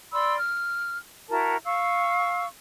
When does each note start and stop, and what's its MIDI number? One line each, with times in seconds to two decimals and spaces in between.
0.13 0.36 74
0.13 0.36 83
0.13 0.36 84
0.13 0.36 88
0.38 0.98 89
1.29 1.56 64
1.29 1.56 66
1.29 1.56 70
1.29 1.56 81
1.64 2.45 77
1.64 2.45 85
1.64 2.45 88